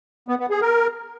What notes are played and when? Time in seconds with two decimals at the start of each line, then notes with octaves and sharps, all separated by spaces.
0.28 B3
0.39 B3
0.50 G#4
0.61 A#4